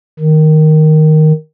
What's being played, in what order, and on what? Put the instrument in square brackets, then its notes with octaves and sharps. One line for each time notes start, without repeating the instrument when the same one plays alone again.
[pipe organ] D#3